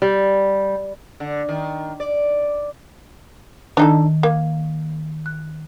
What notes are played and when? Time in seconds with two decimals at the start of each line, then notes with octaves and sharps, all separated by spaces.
0.02 G3
1.20 D3
1.49 D#3
2.00 D5
3.77 D#3 D4 D#4 A4
4.23 A#3
5.26 F#6